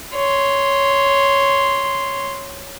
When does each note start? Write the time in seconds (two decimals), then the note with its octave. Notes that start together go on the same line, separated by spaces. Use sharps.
0.14 C#5 C6